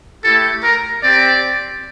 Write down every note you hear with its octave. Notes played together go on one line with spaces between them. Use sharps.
A3 E4 G4 A4
A#4
C4 G4 D5